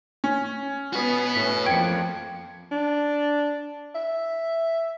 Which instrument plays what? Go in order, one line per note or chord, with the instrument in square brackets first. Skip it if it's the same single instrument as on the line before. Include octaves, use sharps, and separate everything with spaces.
[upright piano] C#4
[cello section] B3 [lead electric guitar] F#4 B4
[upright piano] A2 A3 [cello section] C#4 [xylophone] B6
[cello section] F2 F3 A#3 [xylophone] G5 [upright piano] G#6 C#7
[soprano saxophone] D4
E5